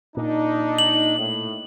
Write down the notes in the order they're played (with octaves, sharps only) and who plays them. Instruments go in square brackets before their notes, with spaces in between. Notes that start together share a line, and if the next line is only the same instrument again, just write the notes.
[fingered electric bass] A#2 [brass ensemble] D4 D#4
[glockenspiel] F#7
[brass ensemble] A2